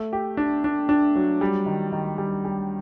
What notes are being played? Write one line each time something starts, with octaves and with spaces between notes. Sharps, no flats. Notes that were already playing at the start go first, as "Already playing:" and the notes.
Already playing: A3
G4
D4
D4
D4
F#3
G3
D#3
D#3
G3
G3